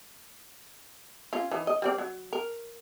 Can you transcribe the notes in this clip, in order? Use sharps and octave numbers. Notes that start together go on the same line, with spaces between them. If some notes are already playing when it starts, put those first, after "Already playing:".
C#4 F4
E3 D#4
D#5
G3 C4 D5
F#3
A#4